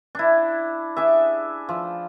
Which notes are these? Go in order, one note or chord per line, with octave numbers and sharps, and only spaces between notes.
D4 E4
D4 G#4 E5
F3